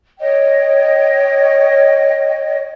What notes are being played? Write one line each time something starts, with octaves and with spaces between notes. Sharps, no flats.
C#5 D#5 G5